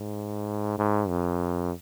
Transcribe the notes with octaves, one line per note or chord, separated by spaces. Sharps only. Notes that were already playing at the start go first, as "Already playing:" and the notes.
Already playing: G#2
G#2
F2